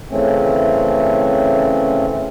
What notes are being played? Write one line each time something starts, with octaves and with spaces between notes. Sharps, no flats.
C#3 E3 A3 C4 C#4